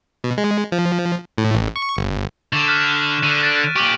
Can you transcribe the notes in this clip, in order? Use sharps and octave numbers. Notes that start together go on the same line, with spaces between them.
B2
G#3
F3
A2
A1
C#6
G1
D3 C#6 E7
F6 F#6 B6
D3 D#7
F#6 A6 D7
A#2 G4 C#6 D6 F#7